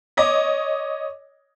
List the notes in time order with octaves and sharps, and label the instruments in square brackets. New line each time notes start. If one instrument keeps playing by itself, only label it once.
[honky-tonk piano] C#5 D#5 D6